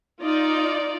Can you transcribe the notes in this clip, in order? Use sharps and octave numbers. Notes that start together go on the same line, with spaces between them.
D#4 F4 D5